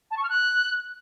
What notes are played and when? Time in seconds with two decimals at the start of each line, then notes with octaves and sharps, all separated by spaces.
0.11 A5
0.17 C#6
0.23 F6
0.30 F#6